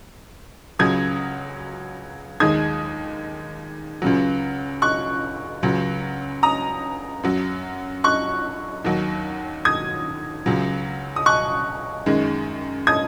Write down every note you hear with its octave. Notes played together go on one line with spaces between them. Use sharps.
C#2 C#3 F#3 D#6 G#6
D#2 D#3 G#3 D#6 G#6
C#2 C#3 F#3
C#6 F#6
C#2 C#3 F#3
A#5 D#6
F#2 F#3
C#6 F#6
D#2 D#3 F#3
D#6 G#6
C#2 C#3 F#3
D#6
C#6 F#6
F#2 D#3 G#3
D#6 G#6